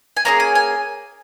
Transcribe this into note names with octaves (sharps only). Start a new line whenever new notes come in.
G#5
A#3 C#4 G#4 A#5
G#5
G#5